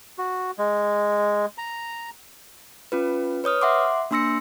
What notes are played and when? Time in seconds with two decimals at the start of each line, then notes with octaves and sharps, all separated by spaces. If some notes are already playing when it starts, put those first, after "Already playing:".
0.18 F#4
0.58 G#3
1.58 A#5
2.92 C#4 F4 B4
3.44 B4 C#5 D#6 F6
3.62 E5 F#5 C6 D6
4.11 A#3 D4 C6 E6 A#6 C#7